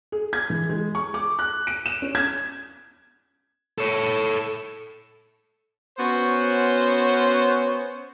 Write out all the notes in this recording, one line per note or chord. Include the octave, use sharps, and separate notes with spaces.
G#4
G#6
E3
G#3
C#6
D6
F#6
D7
E7
C#4
G#6
A4 C#5
B3 C#4 F#4 C5 C#5